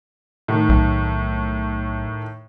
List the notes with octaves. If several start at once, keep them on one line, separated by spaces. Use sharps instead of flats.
A2 D#3
B1